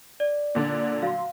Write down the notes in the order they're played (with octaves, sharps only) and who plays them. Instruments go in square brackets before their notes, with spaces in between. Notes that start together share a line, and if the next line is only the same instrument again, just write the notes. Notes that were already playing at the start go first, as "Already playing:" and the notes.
[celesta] D5
[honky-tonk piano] A#2 D3 D4
[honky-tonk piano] F#3 C6 [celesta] F5